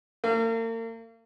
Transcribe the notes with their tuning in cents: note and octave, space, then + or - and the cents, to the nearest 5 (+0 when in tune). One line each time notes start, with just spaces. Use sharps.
A#3 -40 F5 -40